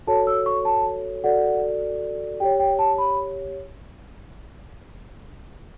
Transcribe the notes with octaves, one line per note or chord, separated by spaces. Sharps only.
F#4 A4 C#5 A5
E6
C#6
A5
F#4 A4 D5 F#5
G4 C#5 G5
G5
A5
B5